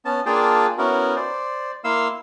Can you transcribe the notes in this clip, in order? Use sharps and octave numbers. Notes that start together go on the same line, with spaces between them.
B3 C#4 A5
A#3 D4 F4 G#4 G5 A5
B3 C#4 E4 F#4 A#4
C5 D5
A#3 E4 F5 C6 E6